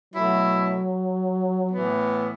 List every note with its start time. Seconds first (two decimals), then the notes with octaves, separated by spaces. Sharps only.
0.14 B2 F#3 A3 E4
1.72 A2 E3 B3